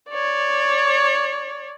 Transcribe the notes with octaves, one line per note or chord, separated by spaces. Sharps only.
C#5 D5